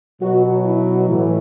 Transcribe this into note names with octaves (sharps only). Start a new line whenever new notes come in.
B2 F#3 F#4
E4
A2 E3